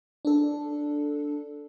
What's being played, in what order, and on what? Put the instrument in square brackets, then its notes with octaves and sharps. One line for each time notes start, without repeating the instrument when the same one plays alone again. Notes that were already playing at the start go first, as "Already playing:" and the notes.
[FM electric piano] D4 A4